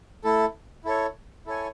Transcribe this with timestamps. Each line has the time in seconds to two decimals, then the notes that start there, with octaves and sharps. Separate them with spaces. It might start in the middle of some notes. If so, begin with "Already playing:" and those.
0.24 A3 E4 A4
0.85 E4 A4 C#5
1.46 E4 A4 C#5 G#5